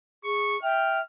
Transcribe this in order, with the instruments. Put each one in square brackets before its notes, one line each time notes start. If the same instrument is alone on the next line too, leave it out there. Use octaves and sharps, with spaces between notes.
[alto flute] G#4 [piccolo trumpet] C#6
[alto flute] E5 [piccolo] G5 [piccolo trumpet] F6